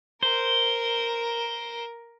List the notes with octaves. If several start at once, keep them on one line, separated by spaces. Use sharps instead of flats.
A#4 C5